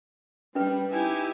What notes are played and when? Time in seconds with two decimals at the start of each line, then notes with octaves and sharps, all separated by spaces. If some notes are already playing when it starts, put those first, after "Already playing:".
0.55 G3 C#4 B4
0.91 D#4 E4 G4 G#5